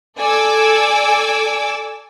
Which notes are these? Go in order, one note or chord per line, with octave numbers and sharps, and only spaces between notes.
A4 D5 G#5 D6 E6